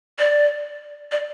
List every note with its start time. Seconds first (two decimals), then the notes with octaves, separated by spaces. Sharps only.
0.19 D5
1.12 D5